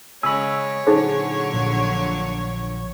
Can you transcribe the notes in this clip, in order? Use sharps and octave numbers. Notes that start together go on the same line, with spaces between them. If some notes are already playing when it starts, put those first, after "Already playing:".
C#3 G#3 C#5 G#5 B5 E6
A#2 D3 F#3 D#4 G#4 C5
A#1